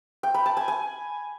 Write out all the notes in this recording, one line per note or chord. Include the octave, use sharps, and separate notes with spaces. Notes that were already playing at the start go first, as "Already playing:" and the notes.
G5
B5
A5
G#5
G#5